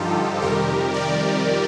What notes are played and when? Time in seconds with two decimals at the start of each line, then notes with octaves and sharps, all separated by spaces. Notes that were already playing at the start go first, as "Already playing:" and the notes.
Already playing: G2 D3 F3 D#4 F4 G4 A4
0.42 F2 C3 D#3 G3 G4 A#4
0.94 A#4 D5